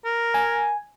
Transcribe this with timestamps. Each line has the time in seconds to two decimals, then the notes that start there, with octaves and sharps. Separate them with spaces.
0.05 A#4
0.34 G#5